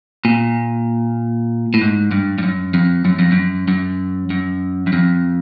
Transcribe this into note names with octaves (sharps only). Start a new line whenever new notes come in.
A#2
A2
G#2
G2
G2
F#2
F2
F#2
F2
F#2
F#2
F#2
F#2
F2